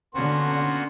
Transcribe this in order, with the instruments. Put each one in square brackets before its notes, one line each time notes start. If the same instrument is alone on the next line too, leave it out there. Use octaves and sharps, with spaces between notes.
[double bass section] D3 C#4 [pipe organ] A#3 B3 F#4 [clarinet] C6